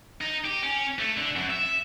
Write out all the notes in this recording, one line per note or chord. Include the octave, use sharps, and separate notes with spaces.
D#4
G4
C#4
A3
D3
F#2
E5